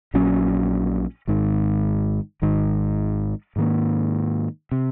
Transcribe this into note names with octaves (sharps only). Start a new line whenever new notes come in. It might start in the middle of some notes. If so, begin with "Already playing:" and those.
A#1 A#2 F#3 C#4
G#1 G#2 D#3
G#1 G#2 D#3
G#2 D#3 A#3
C3